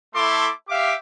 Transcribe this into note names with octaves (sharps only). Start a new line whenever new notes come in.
A3 E4 A4 C6 D6
G4 E5 F5 D6